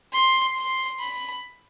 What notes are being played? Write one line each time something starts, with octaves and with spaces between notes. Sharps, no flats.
C6
C6
B5